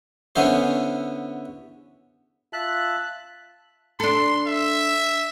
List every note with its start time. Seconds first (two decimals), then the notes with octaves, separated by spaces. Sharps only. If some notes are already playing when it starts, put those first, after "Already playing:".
0.36 D3 B3 C#4 E4 C5
2.53 F4 E5 A5 F#6
4.00 D4 A4 C6
4.47 E5